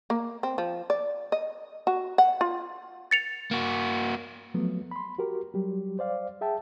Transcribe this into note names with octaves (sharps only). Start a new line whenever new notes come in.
A#3
C4
F3
D5
D#5
F#4
F#5
F4
A6 C#7 F7
A#3 F#4
F3 F#3 A3 B3
B5 C6
F#4 G4 A#4
F#3 G3 G4
C5 D5 F5
G#4 E5 G5 A5